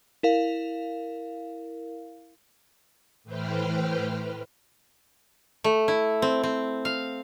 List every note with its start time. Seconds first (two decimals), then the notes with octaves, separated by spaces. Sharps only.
0.23 E4 A#4 F5
3.24 A2 E3 B4 C5 G5 F6
5.64 A3
5.88 E4
6.22 C4
6.43 C4
6.85 F5